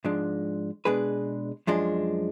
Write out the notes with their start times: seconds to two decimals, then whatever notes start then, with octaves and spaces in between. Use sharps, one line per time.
0.05 G#2 F3 G#3 D4
0.85 B2 G#3 D4 G#4 B4
1.67 F#2 F3 G#3 D4